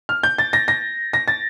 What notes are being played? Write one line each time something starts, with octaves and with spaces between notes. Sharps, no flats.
F6
G6
A6
A#6
A#6
A#6
A6